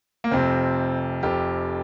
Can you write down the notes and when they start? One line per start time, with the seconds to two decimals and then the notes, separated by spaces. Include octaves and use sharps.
0.24 A#3
0.31 F1 F2 C3 C4
1.23 F1 F2 C3 G4